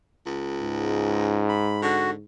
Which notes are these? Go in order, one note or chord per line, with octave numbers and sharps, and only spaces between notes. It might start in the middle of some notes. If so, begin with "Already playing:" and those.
C#2
G#2
B5
D3 F#4